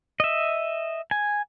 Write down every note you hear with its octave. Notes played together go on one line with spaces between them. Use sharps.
D#5 E5
G#5